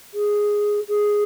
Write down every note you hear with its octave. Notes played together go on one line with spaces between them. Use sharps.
G#4
G#4